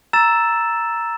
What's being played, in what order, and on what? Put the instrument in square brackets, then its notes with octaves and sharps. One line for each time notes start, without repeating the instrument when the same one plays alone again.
[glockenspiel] A#5 E6 A6 E7